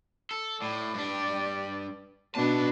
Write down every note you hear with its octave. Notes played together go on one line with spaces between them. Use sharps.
A4
A2 D5
G2 D4
B2 D4 B4 A5